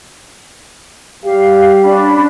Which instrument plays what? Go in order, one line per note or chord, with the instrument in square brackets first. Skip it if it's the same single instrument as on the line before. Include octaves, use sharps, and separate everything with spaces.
[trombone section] G3 G4 [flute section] F5
[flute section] C#4 D4 B5